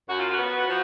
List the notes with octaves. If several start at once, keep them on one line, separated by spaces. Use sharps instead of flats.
F#2 F#4
F4
F#4
B3
F3